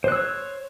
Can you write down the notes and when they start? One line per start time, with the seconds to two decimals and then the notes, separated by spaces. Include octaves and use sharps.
0.04 C5
0.08 F#6
0.12 E6
0.16 C#5